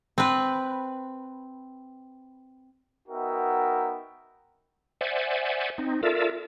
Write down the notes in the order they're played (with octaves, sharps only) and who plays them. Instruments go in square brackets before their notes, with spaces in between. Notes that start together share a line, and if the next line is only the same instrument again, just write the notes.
[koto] C4 B4
[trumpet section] B3 D#4 F#4 A#4 E5 G5
[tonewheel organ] C5 D5 E5 F#5 G#5
C4 D#4
F4 A4 A#4 D5 E5